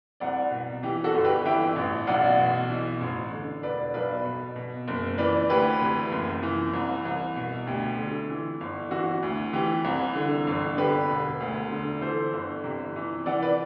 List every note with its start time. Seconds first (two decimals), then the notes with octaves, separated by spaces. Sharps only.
0.20 C2 D5 F#5
0.51 B2
0.83 E3 G4
1.04 F#4 A4
1.14 G1
1.24 G4 B4
1.45 E3 E5 G5
1.76 A1
2.07 B1 D5 F#5
2.38 B2
2.69 E3
3.01 A1
3.31 D3
3.63 E1 B4 D5
3.94 B1 B4 D5
4.25 B2
4.56 B2
4.88 F#1
5.18 E3 B4 D5
5.49 D2 G4 B4
5.80 C3
6.12 F#1
6.42 E3
6.74 C2
7.05 C2
7.36 B2
7.67 D2 G4
7.98 D3
8.29 E3
8.60 G1
8.91 E3 F#4
9.23 D2
9.53 E3 G4
9.85 C2
10.15 D3
10.47 G1
10.77 D3 G4 B4
11.09 E1
11.40 D2
11.71 D3
12.02 E3 A4 C5
12.33 G1
12.64 C3
12.96 E3
13.26 E3 D5 F#5
13.42 B4 D5